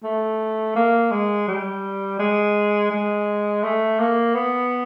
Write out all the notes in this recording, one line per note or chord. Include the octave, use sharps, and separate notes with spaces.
A3
A#3
G#3
G3
G#3
G#3
A3
A#3
B3